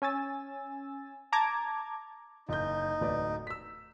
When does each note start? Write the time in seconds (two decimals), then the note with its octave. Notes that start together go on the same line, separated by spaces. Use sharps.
0.02 C#4 G#5 E6 A6
1.32 A5 A#5 D6 G#6
2.49 F#1 D#4 G6
3.01 D1 B4 D5
3.47 E6 B6